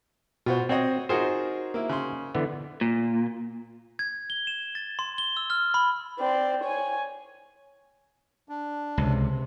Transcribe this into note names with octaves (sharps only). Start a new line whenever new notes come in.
B2 F4 F#4 C5
C4 F#4 C#5 D#5
D#4 F4 F#4 G#4 A#4 C5
A#3 E4
C#3 C6
D3 E3 B3
A#2
G#6
G7
E7
A6
C6
G7
E6
F6
B5
C4 D5
C#5 G#5
D4
C#2 C3